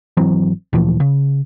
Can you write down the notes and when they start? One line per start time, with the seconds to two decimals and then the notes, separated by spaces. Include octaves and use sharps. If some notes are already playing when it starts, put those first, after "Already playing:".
0.17 G#1 E3 F#3 C4
0.73 D2 A#2 E3 F3
1.00 C#3